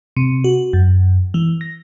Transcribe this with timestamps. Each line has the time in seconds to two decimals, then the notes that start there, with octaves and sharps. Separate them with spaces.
0.17 C3
0.44 F#4
0.73 F#2
1.34 E3
1.61 A#6